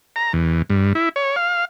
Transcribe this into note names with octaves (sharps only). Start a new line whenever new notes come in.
A#5
E2
G2
E4
C#5
F5